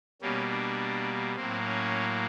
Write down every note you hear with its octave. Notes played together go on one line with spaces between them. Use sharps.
B2 G3 A#3 C#4
D4
A2 F#3 A#3 C4
C#4